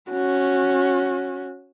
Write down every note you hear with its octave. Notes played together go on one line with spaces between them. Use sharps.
C#4 F#4